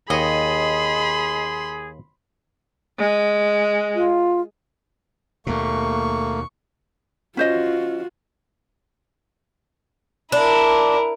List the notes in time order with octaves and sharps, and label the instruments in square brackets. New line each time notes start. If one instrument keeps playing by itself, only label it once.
[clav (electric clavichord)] D#2 C#5 [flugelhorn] G#4 [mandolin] D#5 [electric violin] B5 C6
[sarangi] G#3
[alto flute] F4
[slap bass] D#2 B2 [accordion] A3 [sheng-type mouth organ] A#3 [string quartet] C#6
[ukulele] C#4 C5 D#5 [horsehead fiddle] F4 F#4
[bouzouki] D4 [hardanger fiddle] E4 A#4